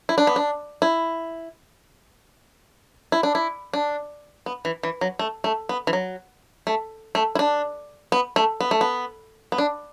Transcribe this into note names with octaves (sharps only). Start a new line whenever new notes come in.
E4
D4
B3
D4
E4
E4
D4
E4
D4
B3
E3
E3
F#3
A3
A3
B3
E3
F#3
A3
A3
E4
D4
B3
A3
B3
A3
B3
B3
D4